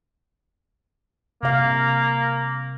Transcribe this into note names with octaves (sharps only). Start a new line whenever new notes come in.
C3 A#3 F5